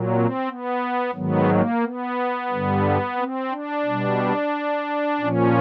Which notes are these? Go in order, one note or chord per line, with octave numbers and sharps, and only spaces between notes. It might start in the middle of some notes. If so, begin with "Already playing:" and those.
Already playing: A#2 F#3
C4
B3
G#2 D#3 F#3 B3
A#3
B3
G2 D3 G3
C4
D4
B2 G3
A#2 F3 C#4